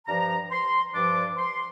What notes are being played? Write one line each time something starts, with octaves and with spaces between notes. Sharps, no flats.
G2 F3 D4 A#5
C6
G2 F3 D4 D6
C6